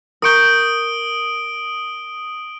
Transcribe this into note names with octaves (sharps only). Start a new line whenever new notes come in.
A#4 C#6 D#6 G6 D7 G7